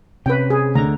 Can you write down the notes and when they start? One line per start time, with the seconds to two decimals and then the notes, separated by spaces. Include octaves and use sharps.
0.26 C3 C#4 B4 G5
0.50 G#4
0.75 D2 D3 A#5